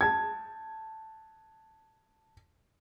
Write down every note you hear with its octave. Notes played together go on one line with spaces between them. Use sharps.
A5 G#6